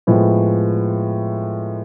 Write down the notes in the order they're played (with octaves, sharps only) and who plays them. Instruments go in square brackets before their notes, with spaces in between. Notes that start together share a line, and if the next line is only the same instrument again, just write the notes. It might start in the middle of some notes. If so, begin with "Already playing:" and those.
[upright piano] A2 F3 G#3 B3